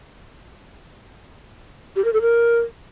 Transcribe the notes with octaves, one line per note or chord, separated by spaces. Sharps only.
G4
A#4
A4
A#4